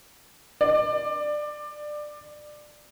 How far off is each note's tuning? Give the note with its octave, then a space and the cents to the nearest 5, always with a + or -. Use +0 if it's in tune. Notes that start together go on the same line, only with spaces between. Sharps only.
D5 +20